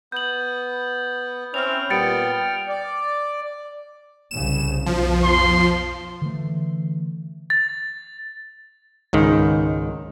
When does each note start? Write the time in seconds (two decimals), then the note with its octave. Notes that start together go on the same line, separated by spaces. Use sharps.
0.12 B3 G6 F#7
1.54 C4 C#4 E4 F6 F7
1.90 A#2 G3 B3 G5 A6 C#7 D7
2.67 D5
4.31 C2 C#3 E7
4.86 B1 F2 B2 F3
5.23 C6
6.22 D3 E3 A3
7.50 A6
9.13 C#2 G#2 D#3